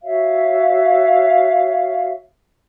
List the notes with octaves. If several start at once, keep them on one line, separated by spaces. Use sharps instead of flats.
F#4 C#5 E5 F5